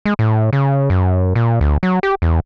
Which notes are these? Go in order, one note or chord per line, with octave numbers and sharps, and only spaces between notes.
G#3
A2
C#3
F#2
A#2
D2
F#3
G4
E2